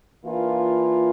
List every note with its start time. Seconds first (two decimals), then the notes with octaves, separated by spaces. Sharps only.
0.24 E3 A#3 D4 F4